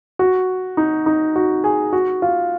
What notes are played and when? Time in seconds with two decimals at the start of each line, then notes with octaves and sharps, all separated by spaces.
0.19 F#4
0.77 D#4
1.06 D#4
1.36 F#4
1.64 G#4
1.93 F#4
2.22 F4